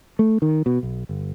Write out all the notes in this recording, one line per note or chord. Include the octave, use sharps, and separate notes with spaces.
A3
D#3
B2
B1
G1